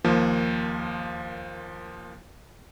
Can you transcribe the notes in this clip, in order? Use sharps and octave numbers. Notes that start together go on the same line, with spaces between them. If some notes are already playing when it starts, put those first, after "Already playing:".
D#2 F3 A#3